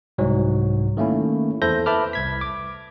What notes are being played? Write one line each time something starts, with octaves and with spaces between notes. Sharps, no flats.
C2 G#2 F#3
D#3 A3 A#3 C#4 E4
E2 E4 A4 C5 G6 A#6
B4 E5 A5 B5 D6 F6
C2 G#6 B6
D6